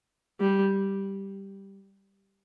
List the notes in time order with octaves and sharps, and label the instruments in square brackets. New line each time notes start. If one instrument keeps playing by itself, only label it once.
[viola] G3